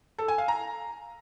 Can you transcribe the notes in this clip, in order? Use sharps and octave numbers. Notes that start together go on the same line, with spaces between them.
A4
G#5
F5
A#5